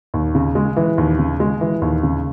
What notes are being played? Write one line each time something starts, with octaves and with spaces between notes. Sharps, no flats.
D#2
C#3
G#3
E3
D#2
C#3
G#3
E3
D#2
C#3